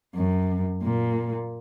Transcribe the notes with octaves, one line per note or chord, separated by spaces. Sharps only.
F#2
A#2